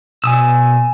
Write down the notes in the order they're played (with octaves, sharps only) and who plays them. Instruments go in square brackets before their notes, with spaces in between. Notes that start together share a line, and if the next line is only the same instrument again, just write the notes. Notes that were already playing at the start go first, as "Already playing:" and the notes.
[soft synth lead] B2 [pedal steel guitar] G#5 D#6 E6